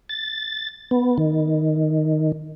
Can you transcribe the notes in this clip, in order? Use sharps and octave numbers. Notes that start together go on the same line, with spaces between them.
A6
B3
D#3